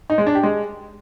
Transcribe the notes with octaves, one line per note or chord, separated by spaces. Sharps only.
D#4
G#3
D4
G4
G#3